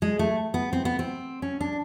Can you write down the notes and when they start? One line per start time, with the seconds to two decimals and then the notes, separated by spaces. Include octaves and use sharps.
0.02 G#3
0.19 A3
0.54 B3
0.73 C4
0.85 B3
0.99 C4
1.42 C#4
1.61 D4